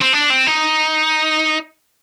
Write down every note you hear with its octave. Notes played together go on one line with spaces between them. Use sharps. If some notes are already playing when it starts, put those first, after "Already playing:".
C4
D4
C4
D#4